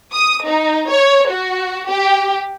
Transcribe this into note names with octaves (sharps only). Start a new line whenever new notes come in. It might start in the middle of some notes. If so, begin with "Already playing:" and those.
D#6
D#4
C#5
F#4
G4